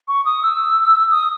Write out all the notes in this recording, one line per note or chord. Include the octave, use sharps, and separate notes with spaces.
C#6
D#6
E6
D#6